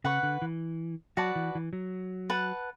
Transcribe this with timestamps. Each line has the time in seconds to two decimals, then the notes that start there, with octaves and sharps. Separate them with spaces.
0.04 C#3 B4 F#5 C#6
0.23 D3
0.42 E3
1.17 F#3 F#4 B4 D5 A5
1.36 E3
1.55 E3
1.73 F#3
2.30 B4 F#5 A5